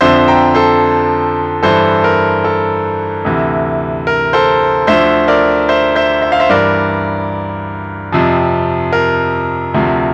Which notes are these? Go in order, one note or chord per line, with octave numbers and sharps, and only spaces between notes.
F2 D3 F3 C5 E5
G5 A#5
A4 C5
G2 E3 A4 C5
A#4
A4
D2 C3 E3
A#4
A4 C5
D2 D3 F3 C5 E5
A#4 D5
C5 E5
C5 E5
E5
F5
C5 E5
G2 E3 A#4 D5
F2 C3 F3
A#4
D2 C3 F3